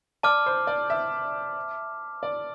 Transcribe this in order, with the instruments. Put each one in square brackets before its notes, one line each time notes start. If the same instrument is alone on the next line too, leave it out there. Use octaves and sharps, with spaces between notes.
[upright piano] D5 [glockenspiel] A5 D6 F6
[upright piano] C5
D5
E5
D5